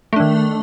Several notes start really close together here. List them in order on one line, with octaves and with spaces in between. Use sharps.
A3 D4 D#3